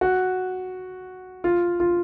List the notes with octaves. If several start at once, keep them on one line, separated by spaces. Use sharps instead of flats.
F#4
F4
F4